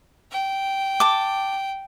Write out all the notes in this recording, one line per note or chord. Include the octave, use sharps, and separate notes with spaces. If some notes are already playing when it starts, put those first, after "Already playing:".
G5
A5 D6